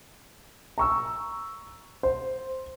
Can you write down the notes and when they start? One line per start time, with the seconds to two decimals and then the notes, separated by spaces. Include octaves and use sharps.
0.78 A#5 C#6 E6
2.03 C5